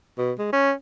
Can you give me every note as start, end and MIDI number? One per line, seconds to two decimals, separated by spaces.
0.18 0.32 47
0.39 0.48 56
0.53 0.72 61